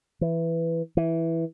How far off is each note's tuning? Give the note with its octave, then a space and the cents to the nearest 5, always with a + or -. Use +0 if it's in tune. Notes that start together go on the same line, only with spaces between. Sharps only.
E3 +5
E3 +0